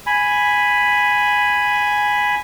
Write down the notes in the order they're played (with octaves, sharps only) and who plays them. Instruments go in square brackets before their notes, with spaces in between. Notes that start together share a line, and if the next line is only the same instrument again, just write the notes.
[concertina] G#5 B5